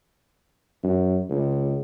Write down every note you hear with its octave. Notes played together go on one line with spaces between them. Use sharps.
F#2
C#2